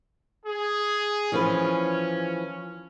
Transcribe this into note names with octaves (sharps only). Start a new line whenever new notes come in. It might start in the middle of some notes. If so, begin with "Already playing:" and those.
G#4
E3 F3 C#4 B4